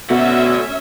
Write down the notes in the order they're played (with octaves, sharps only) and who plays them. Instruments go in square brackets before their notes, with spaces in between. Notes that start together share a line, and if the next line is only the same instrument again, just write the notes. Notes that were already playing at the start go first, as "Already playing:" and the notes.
[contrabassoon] B2 [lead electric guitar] A3 F#4 [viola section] C#4 E5